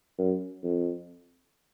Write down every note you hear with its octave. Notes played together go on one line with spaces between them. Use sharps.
F#2
F2